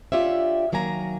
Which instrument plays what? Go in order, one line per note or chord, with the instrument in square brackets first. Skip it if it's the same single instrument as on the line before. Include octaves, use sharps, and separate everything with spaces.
[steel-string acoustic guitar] D4 F4 G4 C#5 D5 E5
D#3 F#3 A#3 G#5 A#5